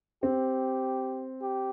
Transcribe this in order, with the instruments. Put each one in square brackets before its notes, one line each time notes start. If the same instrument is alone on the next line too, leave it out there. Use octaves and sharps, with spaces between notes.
[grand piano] C4 [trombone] G4
[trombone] G4